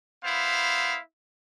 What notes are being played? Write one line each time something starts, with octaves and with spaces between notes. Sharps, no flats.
B3 E4 C5 F5